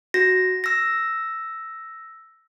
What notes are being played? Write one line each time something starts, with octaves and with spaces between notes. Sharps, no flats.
F#4 A#6
E6 A#6